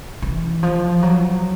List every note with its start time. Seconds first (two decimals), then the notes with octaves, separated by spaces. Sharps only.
0.22 E3
0.63 F3
1.02 F#3